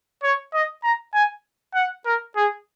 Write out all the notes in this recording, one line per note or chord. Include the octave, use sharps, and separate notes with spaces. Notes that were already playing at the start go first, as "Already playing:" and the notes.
C#5
D#5
A#5
G#5
F#5
A#4
G#4